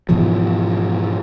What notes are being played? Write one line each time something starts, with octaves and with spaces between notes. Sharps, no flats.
G#2 B2 E3 F3